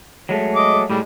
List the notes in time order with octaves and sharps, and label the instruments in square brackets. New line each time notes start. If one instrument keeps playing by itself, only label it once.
[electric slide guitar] F#3 G#3 A3
[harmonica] D#5 D6
[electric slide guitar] A2 G#3 [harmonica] G3